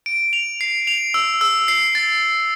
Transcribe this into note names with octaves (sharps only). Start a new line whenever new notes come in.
D7
F7
C7
F7
E6
E6
C7
A6